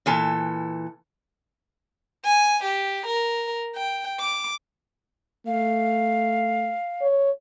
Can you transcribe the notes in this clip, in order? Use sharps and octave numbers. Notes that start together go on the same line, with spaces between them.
A#2 E3 A4
G#5
G4
A#4
G5
D6
A3 F5
C#5